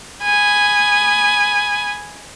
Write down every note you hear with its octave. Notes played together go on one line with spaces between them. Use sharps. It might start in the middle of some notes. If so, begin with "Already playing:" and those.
G#5 B5 D#6